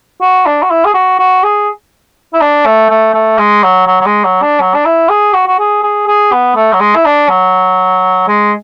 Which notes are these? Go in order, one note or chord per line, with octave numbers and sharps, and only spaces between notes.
F#4
D4
F#4
E4
G#4
F#4
F#4
G#4
E4
D4
A3
A3
A3
G#3
F#3
F#3
F#3
G#3
F#3
D4
F#3
D4
E4
G#4
F#4
F#4
G#4
G#4
G#4
B3
A3
F#3
G#3
E4
D4
F#3
G#3